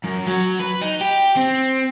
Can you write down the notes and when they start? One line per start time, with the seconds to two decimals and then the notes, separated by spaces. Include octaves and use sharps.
0.04 F#2
0.27 F#3
0.60 B4
0.81 D#4
1.01 G4
1.37 C4